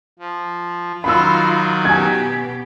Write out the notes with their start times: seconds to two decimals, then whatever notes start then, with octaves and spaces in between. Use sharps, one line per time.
0.19 F3
1.04 D#3 F#3 F4 B5 E6
1.85 B2 G4 G#5 G#6